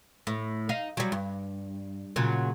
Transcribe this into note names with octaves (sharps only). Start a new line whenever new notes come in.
A2
D#4 F5
F#3 G3
G2
A#2 C#3 F#3